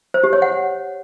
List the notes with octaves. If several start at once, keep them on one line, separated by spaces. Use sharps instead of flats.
C5
G4
C#5
F#5